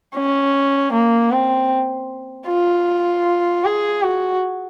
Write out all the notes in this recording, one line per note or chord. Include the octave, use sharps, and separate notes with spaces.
C#4
A#3
C4
F4
G#4
F#4